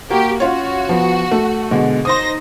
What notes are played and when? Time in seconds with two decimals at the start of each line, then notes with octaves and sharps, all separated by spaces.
0.10 A#3 F#4 G4
0.40 C#4 F4 F#4 C#5
0.89 F3 B3
1.31 A3
1.71 B2 D3 G#3
2.05 D#4 C5 C6 D#6 A#6